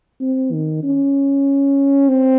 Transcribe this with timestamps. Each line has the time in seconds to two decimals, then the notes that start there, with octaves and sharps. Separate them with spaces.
0.21 C4
0.53 D#3
0.83 C#4
2.08 C4